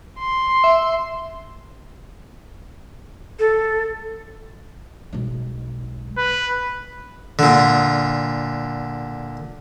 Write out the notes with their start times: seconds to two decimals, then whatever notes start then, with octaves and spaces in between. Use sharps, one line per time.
0.18 C6
0.64 E5
3.39 A4
5.13 B1 G#3
6.17 B4
7.39 A#2 D3